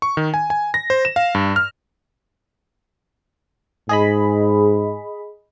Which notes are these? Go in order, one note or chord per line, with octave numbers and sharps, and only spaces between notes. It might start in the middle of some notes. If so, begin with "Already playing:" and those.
C#6
D#3
G#5
G#5
A#6
C5
E7
F5
G2
F6
G#2 G#4 D#5 B5